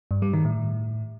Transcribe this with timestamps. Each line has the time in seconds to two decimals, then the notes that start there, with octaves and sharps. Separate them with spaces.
0.11 G2
0.22 G3
0.33 D#3
0.45 A2